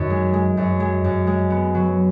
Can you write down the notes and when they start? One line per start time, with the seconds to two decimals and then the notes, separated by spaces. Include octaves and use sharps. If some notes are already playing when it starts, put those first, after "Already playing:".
Already playing: F#2 D#3
0.10 G#3
0.34 G#3
0.57 F#2
0.80 G#3
1.04 F#2
1.27 G#3
1.50 B3
1.75 F#3